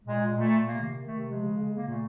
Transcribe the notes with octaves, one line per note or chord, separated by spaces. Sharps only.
A#2 G#3
A#2
A#2 A3
A#2
C3 A#3
D#3
D#3
A3
C3
F3 G#3
C#3
C#3
C#3 A#3
A#2 A3